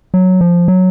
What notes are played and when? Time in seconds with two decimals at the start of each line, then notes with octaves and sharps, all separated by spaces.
0.14 F#3
0.41 F3
0.68 F#3